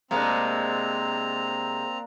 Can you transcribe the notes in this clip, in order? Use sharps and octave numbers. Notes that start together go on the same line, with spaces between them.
C3 G#3 A#3 C4 D4 A#5